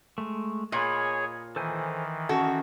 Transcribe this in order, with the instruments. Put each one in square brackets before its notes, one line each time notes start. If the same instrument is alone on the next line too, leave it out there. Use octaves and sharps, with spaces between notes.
[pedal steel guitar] G#3 A3
[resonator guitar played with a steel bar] A#2 [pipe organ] G#4 C#5 [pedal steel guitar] D#5 G#5 B5
[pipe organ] D#3 E3 [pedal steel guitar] A4 C5 G#5
[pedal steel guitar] C#4 [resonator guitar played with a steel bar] F#4 A4